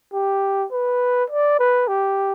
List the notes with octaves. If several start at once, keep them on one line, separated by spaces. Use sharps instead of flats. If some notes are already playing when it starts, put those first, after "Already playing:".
G4
B4
D5
B4
G4